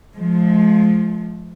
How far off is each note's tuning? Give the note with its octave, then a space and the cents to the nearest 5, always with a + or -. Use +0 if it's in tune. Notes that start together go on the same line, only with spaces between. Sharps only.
F3 +0 G#3 +40